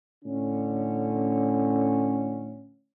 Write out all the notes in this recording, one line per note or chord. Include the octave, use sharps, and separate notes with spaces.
A2 D3 C#4